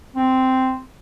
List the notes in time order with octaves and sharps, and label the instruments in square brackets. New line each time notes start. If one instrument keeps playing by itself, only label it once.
[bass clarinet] C4